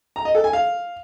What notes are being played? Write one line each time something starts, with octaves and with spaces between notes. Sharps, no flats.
A#5
D#5
A4
G#5
F5